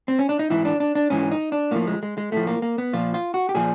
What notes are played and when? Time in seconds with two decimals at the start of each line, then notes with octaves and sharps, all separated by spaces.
0.08 C4
0.19 C#4
0.29 D4
0.39 D#4
0.50 G#2 E3 E4
0.65 D4
0.80 D4
0.95 D4
1.10 G#2 E3 C#4
1.31 D#4
1.52 D4
1.71 A2 F3 A#3
1.87 G#3
2.03 G#3
2.18 G#3
2.32 A2 F3 A3
2.47 A#3
2.62 A#3
2.78 B3
2.93 A#2 F3 F4
3.14 F4
3.34 F#4
3.49 G4
3.55 A#2 F3 G#4